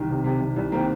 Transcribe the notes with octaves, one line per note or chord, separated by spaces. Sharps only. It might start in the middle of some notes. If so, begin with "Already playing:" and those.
Already playing: C2 D#3
C3
C3
C3
C2
D#3 A#3 C4